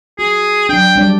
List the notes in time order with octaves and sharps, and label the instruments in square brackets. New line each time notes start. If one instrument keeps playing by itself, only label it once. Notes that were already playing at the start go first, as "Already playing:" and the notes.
[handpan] F#4 [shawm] G#4
[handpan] F#3 D4 [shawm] G5
[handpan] G3 D4 D5